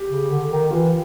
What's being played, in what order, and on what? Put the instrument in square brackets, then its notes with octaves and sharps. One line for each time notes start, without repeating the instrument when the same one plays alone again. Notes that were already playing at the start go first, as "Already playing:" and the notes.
Already playing: [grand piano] G4
[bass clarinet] C#3
D3
D#3
[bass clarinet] E3 [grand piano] F4